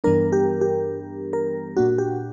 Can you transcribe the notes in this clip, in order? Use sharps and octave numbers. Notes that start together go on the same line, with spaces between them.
G2 E3 G3 B3 D4 A#4
G4
G4
A#4
A#2 A#3 D4 F#4
G4